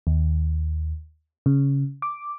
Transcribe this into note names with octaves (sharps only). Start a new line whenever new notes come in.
D#2
C#3
D6